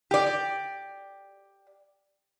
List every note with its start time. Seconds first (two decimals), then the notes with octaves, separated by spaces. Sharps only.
0.11 G4 D5